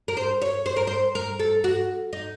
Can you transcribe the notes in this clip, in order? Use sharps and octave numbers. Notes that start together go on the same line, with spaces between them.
A#4
C5
C#5
C5
A#4
C5
A#4
A4
F#4
D#4